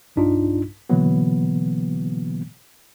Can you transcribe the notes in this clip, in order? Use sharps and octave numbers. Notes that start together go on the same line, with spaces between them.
B1 G2 D4 D#4 F4
B2 D3 E3 F#3 A#3 B3